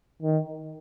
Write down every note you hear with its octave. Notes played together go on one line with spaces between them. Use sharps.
D#3